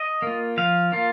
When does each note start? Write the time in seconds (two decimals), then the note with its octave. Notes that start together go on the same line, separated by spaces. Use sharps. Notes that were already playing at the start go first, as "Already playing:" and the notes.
Already playing: D#5
0.22 A#3 F4
0.57 F3 F5
0.92 A#3 F4